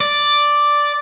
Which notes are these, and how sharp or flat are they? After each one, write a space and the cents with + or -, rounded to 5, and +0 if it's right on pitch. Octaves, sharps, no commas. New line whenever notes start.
D5 +0